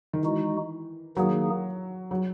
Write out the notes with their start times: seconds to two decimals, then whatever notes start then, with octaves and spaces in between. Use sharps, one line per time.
0.13 D#3
0.23 E3 G#3 D#4 F#4
1.17 D#3 F#3 A#3 D#4 G#4
2.11 F#3